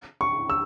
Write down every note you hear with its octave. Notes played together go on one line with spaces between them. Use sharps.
C#6
E6